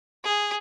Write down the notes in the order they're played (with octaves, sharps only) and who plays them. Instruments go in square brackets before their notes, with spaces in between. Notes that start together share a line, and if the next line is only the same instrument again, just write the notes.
[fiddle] G#4